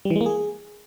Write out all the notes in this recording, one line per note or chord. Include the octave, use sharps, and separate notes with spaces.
G3
E3
G#3
A#3
G#4